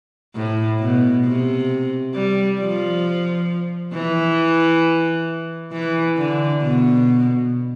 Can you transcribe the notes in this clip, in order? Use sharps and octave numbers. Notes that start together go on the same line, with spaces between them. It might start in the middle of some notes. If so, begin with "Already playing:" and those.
A2
B2
C3
G3
F3
E3
E3
D3
B2